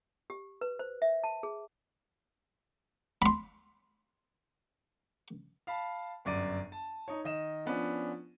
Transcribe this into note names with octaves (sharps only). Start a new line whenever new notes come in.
G4
B4
C5
E5
A5
G#4
B5 C6
F5 A5 B5
G1 F#2 D5 D#7
A5
D#4 C#5
D#3 D#5 E7
F3 B3 C#4 D4